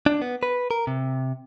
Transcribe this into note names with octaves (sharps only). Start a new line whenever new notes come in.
D4
B3
B4
A#4
C3